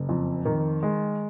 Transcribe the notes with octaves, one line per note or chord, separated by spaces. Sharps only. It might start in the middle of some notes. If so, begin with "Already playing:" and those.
Already playing: F#1
F2
D#3
G#3